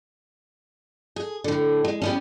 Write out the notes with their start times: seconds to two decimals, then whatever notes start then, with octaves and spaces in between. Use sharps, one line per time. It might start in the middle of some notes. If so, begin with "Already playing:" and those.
1.16 G#4
1.44 A2 D3
1.85 G#3
2.02 G3 B3 C#4